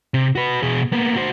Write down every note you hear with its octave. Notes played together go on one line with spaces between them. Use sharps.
C3
F#4 B4
B2 G#4
A#3 B3
F#4 C5